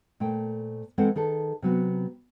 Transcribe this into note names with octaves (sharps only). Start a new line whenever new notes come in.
A#2 A3 C5 G5
E3 G#3 C4 A4 C5 F#5
D#3 G#4 A4 B4
C3 F#3 B3